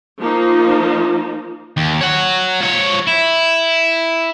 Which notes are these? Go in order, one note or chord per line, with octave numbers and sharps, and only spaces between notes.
F3 A#3 D#4 F4
D#2
C#5 F#5
F3 C#5
E4